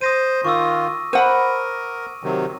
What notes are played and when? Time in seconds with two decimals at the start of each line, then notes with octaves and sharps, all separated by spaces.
0.01 C5 D#6 A#6 D#7
0.45 D#3 F4 C#6 D6 E6
1.13 A#4 C5 F#5 B5 D#7
2.24 C3 D#3 F#3